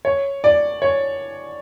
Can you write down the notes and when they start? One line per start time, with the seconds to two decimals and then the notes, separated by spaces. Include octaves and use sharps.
0.05 C#5
0.44 D5
0.82 C#5